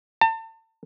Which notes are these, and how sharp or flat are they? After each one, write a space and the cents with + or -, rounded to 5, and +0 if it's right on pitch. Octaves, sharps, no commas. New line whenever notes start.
A5 +35